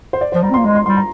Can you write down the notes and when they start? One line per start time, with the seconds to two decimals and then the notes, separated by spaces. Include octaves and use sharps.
0.13 C5
0.21 D5
0.32 F3 C5
0.43 G3 A#5
0.50 C4
0.54 C6
0.57 A#3
0.64 G#3 C6
0.75 C6
0.86 G3 C6
0.97 A#5